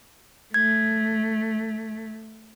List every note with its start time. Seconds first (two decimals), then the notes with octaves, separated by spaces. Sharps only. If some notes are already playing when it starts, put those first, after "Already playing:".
0.54 A3 G#6